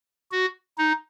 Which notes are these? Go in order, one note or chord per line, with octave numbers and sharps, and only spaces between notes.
F#4
D#4